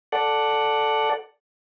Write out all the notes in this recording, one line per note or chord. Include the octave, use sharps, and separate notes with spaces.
A4 D5 F#5